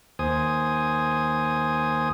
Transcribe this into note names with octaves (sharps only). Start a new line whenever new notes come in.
D#2 C5 G#5 D#6